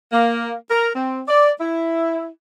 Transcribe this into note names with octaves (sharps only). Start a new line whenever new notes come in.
A#3
A#4
C4
D5
E4